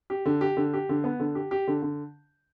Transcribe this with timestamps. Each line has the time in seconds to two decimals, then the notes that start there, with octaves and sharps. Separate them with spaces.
0.10 G4
0.25 D3
0.41 G4
0.57 D3
0.73 G4
0.89 D3
1.04 B3
1.20 D3
1.35 G4
1.51 G4
1.67 D3
1.82 D3